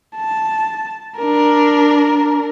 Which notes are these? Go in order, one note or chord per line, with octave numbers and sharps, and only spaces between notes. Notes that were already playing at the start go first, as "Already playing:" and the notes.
A5
D4 A#4